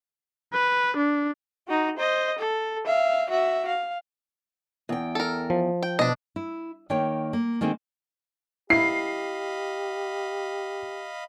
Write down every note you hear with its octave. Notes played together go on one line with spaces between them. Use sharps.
B4
D4
D#4 F#4
C5 D#5
A4
E5 F5
F#4 E5
F5
E2 G5
A4 A#4
F3
G5
B2 D4 D#5
E4
D#3 A#3 C#5 G5
A#3
D#3 G#3 A#3 C4 D#4
E4 G4 D#5 F5 B5 C7